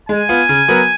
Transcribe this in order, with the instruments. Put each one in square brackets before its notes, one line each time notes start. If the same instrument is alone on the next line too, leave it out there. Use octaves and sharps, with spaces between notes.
[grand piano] G#3 [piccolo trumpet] G#5
[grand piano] B3 F4
C#3
F#3 B3 F#4 A#4